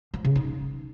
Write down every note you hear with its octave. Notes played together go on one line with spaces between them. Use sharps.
F3
C#3
D#4